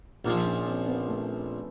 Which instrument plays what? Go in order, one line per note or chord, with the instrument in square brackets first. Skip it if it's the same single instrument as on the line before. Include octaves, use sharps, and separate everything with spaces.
[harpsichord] A#1 A#2 F3 [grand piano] D#4
[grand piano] C#4
C4
B3
A3